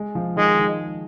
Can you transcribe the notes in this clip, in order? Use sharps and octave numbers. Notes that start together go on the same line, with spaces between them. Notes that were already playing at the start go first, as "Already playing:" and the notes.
Already playing: G#3
F3
D#3 G#3
D#3